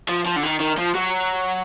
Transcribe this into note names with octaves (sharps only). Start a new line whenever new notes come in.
F3
F3
D3
D#3
D#3
F3
F#3